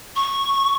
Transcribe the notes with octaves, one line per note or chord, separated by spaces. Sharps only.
C#6